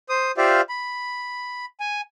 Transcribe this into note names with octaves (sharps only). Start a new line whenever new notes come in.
C5 D#6
F4 G4 C5 D5 E5 F5
B5
G#5